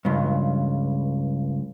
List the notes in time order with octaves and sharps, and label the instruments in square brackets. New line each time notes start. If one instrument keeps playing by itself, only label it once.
[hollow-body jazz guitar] C#2 G2